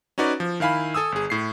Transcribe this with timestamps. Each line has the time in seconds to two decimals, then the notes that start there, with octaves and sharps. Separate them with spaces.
0.18 C#4 D#4 F#4 B4 D5
0.40 F3
0.60 D#3 E4 F5 G#5 B5
0.94 A4 G#5 D#6 E6
1.12 G1 G#4
1.30 A2 C7